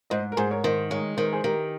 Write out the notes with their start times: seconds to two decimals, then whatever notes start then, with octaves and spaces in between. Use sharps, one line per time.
0.10 G#2 C5 D#5
0.32 A#4
0.37 G#2 G#4 C5
0.51 A#4 C#5
0.64 D#3 C5 D#5
0.91 G#3 A#4 C#5
1.17 D#3 C5
1.25 A#4
1.33 G#4 C5
1.44 D#3 G4 A#4